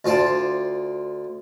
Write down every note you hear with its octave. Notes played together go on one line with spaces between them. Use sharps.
D2 F4 C5 D5 A5